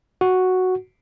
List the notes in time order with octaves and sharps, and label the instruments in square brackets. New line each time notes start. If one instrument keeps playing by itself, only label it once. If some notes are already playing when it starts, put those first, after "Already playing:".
[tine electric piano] F#4